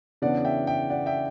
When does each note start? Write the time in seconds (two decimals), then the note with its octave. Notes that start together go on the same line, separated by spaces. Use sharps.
0.22 E2 C#3 E3 B3 D4 D5 F#5
0.45 E5 G5
0.67 E5 G5
0.90 D5 F#5
1.06 E5 G5